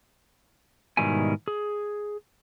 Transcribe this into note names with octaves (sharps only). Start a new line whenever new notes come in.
G#2 B2 D#3 G3 E4 G#5
G#4